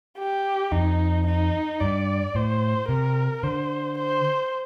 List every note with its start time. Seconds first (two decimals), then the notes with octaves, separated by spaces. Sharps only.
0.18 G4
0.72 F2 D#4
1.27 D#4
1.81 G2 D5
2.35 A2 C5
2.89 C3 A#4
3.43 D3 C5
3.98 C5